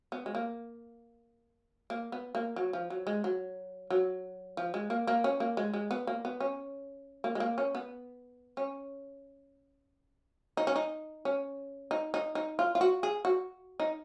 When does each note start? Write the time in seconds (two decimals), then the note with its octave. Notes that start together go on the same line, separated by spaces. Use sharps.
0.12 B3
0.26 G#3
0.35 A#3
1.90 A#3
2.12 B3
2.35 A#3
2.56 F#3
2.73 F3
2.90 F#3
3.07 G#3
3.24 F#3
3.90 F#3
4.57 F3
4.74 G#3
4.90 A#3
5.07 A#3
5.24 C#4
5.40 A#3
5.57 G#3
5.74 G#3
5.91 B3
6.07 A#3
6.25 B3
6.40 C#4
7.24 A#3
7.35 G#3
7.40 A#3
7.58 C#4
7.75 B3
8.57 C#4
10.57 D#4
10.67 C#4
10.76 D#4
11.25 C#4
11.91 D#4
12.14 D#4
12.35 D#4
12.59 F4
12.75 F4
12.81 F#4
13.03 G#4
13.25 F#4
13.80 D#4